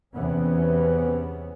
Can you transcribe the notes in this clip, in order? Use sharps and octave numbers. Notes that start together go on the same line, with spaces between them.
E2 C3 E3 B3 C#4